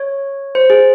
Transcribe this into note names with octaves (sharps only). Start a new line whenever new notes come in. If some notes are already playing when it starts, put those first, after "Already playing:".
Already playing: C#5
C5
G#4